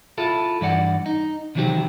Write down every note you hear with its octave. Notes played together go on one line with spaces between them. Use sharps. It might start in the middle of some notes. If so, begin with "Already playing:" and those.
E4 F4 A4
G2 E3 D5 F#5
D#4
C3 D#3 E3 F#3 C4 G4